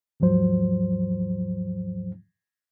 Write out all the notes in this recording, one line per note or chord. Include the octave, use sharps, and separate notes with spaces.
D#2 G#2 F3 F#3 C5